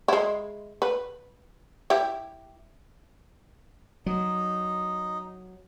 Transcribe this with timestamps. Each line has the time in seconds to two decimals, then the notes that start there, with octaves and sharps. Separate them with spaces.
0.08 G#3 E4
0.82 B4
1.90 E4 G4
4.06 F#3 D#4